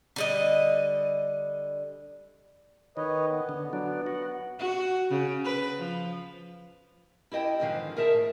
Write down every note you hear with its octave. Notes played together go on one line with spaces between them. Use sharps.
D3 G3 D#5
D#3 B4 C#5 D#5
B3
D3
F#3 B3 D4
F#4
F#4
C#3
B4
F3
E4 G4 D#5 G5 A5
E2 G#2 D3 D#3 F3 F5
G#4 A#4 E5 A5
A2